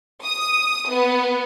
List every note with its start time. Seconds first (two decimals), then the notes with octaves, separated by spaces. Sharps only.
0.23 D#6
0.89 B3